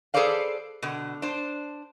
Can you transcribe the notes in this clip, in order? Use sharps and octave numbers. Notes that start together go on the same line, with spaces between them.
G#4 A4 B4 C5 D5 F5
B2 D3
D4 C5